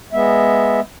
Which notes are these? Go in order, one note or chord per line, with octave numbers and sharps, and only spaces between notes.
G#3 B3 E5